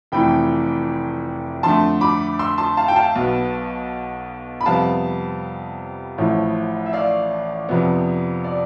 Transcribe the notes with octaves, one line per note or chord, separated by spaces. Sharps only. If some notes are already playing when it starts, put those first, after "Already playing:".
F1 F2 E3 A3 G5 B5
F2 D3 A3 A5 C6
B5 D6
C6 E6
A5 C6
F5 A5
G5
F5 A5
B1 B2 B3
B5
F2 C3 G3 B3 F5 A5
A1 A2 F3 A3
E5
D5 F5
F2 C3 F3 B3
D5